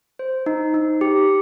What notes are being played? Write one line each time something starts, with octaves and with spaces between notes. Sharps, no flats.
C5
D#4
D#4
G4